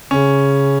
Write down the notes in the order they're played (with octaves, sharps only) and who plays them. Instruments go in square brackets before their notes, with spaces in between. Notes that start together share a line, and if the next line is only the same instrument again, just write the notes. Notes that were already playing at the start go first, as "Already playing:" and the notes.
[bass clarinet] C#3 [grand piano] C#4